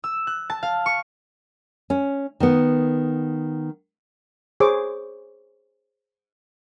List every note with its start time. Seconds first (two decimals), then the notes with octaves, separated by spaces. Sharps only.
0.04 E6
0.27 F#6
0.50 A5
0.63 F5
0.86 C#6
1.90 C#4
2.40 D#3 B3
4.60 G#4 C5 C#5 D6